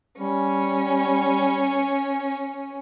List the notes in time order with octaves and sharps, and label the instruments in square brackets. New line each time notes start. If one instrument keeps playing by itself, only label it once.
[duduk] G3 [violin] C#4